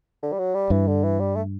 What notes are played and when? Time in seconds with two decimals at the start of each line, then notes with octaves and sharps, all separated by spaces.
0.23 D3
0.32 G3
0.39 F#3
0.55 G3
0.70 G2 E3
0.87 D3
1.03 E3
1.20 G3
1.36 A3